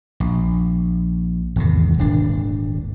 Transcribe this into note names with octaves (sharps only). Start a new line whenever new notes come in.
A#1
G#1 E2 C3
D#1 G#1 D4